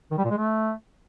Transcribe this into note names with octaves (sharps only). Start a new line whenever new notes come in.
D#3
G3
A#2
G#3
A3